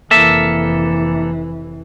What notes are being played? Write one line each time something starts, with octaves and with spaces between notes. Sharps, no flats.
F1 E3 A#3 A4 E5